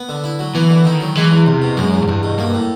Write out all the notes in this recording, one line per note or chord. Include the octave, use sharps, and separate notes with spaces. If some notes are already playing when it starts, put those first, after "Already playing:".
Already playing: B3
D3
E4
F#3
E3 B3
D3
D#3 E4
F#3
E3 G#3
E2
E2 C3
B2
F#2 G#3
E2
G#2
E2 G2
B2
G2 A#3
A2